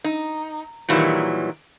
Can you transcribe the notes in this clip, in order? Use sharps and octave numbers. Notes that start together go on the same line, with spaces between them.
D#4
A#2 D#3 E3 F#3 G3